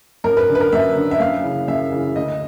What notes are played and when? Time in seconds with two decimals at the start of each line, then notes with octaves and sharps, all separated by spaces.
0.24 F#2 A#4
0.37 B4
0.49 D3
0.55 B4
0.60 A#4
0.72 F#2 E5
0.96 D3
1.11 E5
1.20 F#2 F5
1.44 C#3 E3
1.68 F#2 E5
1.92 C#3 E3
2.15 D2 D#5